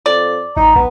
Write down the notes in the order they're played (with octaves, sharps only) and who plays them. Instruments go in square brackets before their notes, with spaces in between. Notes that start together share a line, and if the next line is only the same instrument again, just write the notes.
[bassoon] F2 [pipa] D5
[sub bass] A1 [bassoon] D#4 [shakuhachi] A#5
[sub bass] B1 [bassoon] B3